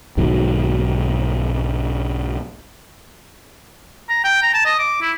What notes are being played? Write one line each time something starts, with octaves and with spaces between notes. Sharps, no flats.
B1 G#2 D#3 F#3
A#5
G5
A#5
A5
D#5
D6
E4